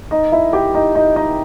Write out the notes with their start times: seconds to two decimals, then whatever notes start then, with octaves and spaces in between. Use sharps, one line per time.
0.11 D#4 D#5
0.32 E4 E5
0.53 G4 G5
0.74 D#4 D#5
0.95 D#4 D#5
1.16 D#4 D#5